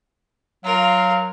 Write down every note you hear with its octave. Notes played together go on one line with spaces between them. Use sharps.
F#3 F4 A#4 F5